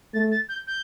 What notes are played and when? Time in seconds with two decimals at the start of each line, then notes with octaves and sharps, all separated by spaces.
0.14 A3 A6
0.31 A6
0.49 G6
0.67 G6